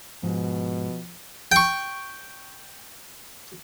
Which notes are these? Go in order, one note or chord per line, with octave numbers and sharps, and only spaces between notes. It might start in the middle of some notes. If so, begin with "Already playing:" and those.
G#2 B2 F3
G5 C#6